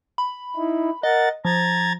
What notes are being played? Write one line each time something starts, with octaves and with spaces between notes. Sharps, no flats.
B5
D#4 E4
A#4 D#5 F#5 A6
F3 A#5 G#6 A6